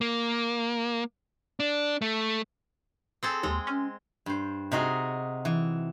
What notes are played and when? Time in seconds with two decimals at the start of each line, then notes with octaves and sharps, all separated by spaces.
0.01 A#3
1.60 D4
2.02 A3
3.23 C4 G#4 A4
3.43 D#2 G#3
3.67 C#4
4.26 G2 C5
4.71 C3 D#4 F#4 G#4
5.45 E3